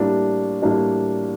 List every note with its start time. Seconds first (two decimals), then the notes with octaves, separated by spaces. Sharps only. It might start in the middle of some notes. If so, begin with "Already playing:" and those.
Already playing: A2 G3 A#3 D4
0.63 A2 G3 A#3 D4